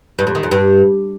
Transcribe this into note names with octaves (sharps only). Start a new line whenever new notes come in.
G2
F2
D#3
F2
G2